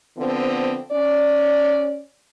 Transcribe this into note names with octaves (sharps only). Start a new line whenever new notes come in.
D3 F3 B3 C4
C#4 D5